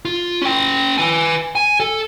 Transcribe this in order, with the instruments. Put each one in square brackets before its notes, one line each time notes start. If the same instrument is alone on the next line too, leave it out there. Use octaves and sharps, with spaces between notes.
[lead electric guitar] F4
C#4 G5
B4 G#5
G#5
A4